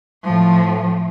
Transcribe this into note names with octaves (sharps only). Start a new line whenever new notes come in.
A2 F3